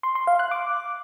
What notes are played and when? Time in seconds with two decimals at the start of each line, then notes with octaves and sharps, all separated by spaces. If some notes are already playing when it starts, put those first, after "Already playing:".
0.03 C6
0.15 C6
0.27 F5
0.39 F#6
0.51 D6